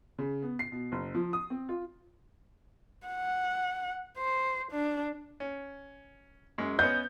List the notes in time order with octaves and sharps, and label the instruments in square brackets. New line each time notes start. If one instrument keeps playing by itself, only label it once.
[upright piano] C#3
B3
C7
B2
F#1
F3
D#6
C4
F4
[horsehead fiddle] F#5
C5
D4
[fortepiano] C#4
F#2 G#3
[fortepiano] B3 C#4 D#5 [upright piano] G6